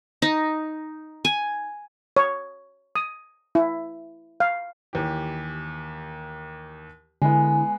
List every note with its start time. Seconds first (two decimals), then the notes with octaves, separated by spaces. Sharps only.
0.22 D#4
1.25 G#5
2.17 C#5
2.95 D#6
3.55 E4
4.40 F5
4.93 D#2 E3 G4
7.22 D3 G#3 B3 E4 G#5